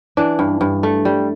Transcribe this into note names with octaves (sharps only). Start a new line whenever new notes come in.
E3 D4
G2
G2
A3
G3